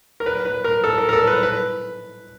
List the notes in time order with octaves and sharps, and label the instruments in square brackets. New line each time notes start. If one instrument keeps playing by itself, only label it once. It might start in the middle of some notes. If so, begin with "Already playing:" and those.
[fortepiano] A#4
B4
B4
A#4
A4
A#4
A#4
A4
B4
B4